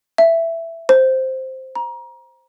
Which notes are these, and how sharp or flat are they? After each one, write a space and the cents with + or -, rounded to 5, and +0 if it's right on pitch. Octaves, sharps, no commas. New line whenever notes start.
E5 +10
C5 +0
A#5 +30